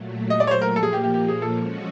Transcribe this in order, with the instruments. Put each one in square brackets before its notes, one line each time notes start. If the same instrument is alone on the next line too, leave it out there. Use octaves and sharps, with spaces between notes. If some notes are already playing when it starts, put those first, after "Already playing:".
Already playing: [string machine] A#2 F#3 A3
[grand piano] D#5
D5
C#5
C5
A#4
[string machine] A#2 F3 A#3 [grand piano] A4
[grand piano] G#4
G4
G4
G4
G#4
A4
[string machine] F3 G#3 C#4 F#4